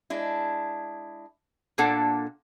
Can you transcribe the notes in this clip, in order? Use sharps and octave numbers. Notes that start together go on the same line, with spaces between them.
G#3 D4 E4
A#2 A#3 D4 A4 F#5